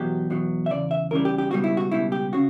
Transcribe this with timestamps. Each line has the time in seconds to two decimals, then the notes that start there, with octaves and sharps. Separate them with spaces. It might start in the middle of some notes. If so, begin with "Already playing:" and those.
Already playing: E2 B2 F#3 G4
0.30 E2 B2 F#3
0.66 E5
0.70 E2 C#3 D5
0.91 E5
1.11 E2 C#3 E3 G3 A#4
1.25 G4
1.38 G4
1.51 C#2 B2 G3 F#4
1.64 E4
1.77 F#4
1.91 C#2 B2 G3 E4
2.12 G4
2.33 C#3 F#4